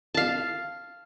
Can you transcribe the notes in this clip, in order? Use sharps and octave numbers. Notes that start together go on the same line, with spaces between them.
F5 A5